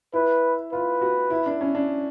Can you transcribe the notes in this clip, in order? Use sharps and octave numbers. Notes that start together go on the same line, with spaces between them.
E4 B4
F4 B4
F#4
E4
D4
C#4
D4